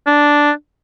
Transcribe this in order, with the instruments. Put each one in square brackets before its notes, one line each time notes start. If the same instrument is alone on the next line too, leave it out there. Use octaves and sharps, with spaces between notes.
[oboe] D4